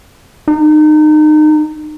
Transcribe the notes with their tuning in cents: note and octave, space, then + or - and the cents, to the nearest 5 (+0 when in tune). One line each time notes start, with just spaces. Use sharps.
D#4 -30